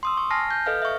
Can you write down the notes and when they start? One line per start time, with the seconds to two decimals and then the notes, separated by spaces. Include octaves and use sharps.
0.03 C6 D#6 E6
0.17 C#6
0.30 G#5 A5 F6 A#6 C7
0.51 G6
0.66 A4 B4 D#5 F5 F6
0.82 E5 C#6